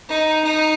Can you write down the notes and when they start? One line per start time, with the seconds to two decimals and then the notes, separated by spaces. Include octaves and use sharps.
0.09 D#4
0.44 D#4